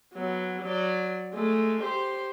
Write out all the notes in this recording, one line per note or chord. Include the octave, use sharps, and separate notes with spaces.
F#3 B3
F#3 D5
G#3 A3
G4 C5